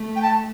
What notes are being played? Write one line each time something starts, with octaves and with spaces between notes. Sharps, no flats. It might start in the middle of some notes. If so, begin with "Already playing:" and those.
Already playing: A3
G5
A5